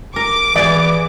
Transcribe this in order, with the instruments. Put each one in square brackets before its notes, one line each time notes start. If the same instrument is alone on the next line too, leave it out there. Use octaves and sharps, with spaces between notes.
[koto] A#4 [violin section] D6
[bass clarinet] E3 [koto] B3 G4 G#4 [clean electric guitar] D5